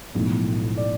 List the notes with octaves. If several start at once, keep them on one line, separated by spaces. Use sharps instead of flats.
B1 A2 F3 G#3
D5